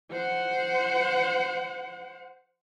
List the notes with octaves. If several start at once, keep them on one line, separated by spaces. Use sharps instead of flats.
C5 F#5